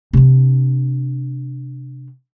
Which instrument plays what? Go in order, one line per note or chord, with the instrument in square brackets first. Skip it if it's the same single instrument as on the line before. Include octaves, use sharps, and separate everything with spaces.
[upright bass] C3 D4